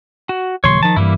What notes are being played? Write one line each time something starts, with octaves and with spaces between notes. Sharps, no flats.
F#4
D#1 C#3 F#3 C#5 C6
D#3 F3 A5
G2 E3 G3 A#3 E4